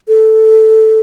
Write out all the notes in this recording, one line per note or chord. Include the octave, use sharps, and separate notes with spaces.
A4